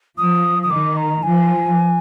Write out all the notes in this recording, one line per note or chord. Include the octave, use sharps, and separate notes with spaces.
F3 D#6
D#6
D#3 D6
A#5
F3 G#5